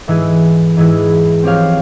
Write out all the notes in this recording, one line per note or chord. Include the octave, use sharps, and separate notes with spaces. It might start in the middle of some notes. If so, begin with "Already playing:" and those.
G#2 E3 G#3 E4 G#4
G#2 E3 G#3 E4 G#4
F3 C4 G4 C#5 F5